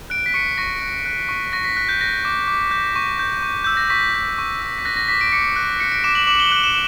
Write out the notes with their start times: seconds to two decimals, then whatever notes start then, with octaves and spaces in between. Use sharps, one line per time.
0.10 F#6 D7
0.26 B6
0.34 C#6 C#7
0.58 C#6 A#6
0.81 F#6
1.06 F#6
1.29 C#6
1.53 C#6 A#6
1.64 B6
1.77 F#6 B6
1.89 G6
2.00 G6 A#6
2.25 D6
2.48 D6
2.71 G6
2.96 C#6
3.19 G6
3.43 C#6
3.64 E6 G6
3.77 A#6
3.90 C#6 B6
4.15 G6
4.38 C#6
4.62 E6
4.79 B6
4.85 F#6 A#6
4.97 A#6
5.08 D6 B6
5.21 D7
5.32 D6 C#7
5.56 F#6
5.80 F#6 C#7
5.92 D7
6.04 D6 E7
6.15 F#7
6.27 D6 F#7
6.40 G7
6.51 F#6 F#7
6.63 E7